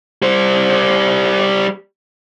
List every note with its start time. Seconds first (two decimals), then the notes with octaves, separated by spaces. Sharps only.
0.22 G3 C5